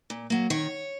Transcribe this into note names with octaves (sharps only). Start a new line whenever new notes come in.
A#2
F#3 A#3
D#3 C#5